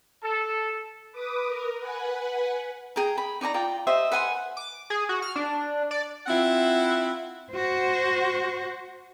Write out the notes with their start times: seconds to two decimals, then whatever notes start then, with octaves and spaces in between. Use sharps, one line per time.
0.23 A4
1.12 B4 D6 D#6
1.48 A#4
1.78 B4 F#5 G#5
2.96 G#4 G5 A#5
3.18 B5
3.41 D#4 D5 G#5 A#5
3.54 F4 D5 G5
3.87 G4 C5 D#5 E5
4.12 B4 F#5 G#5 C6
4.57 D6
4.90 G#4
5.09 F#4
5.22 F6
5.36 D4
5.91 D5
6.27 C4 E4 F4 F#5
7.52 F#4 C5